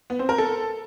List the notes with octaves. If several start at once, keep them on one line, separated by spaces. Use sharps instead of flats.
B3
C4
A#4
A4